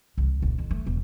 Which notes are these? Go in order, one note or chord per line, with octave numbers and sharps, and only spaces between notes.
C2
D#1
F2
A3
E1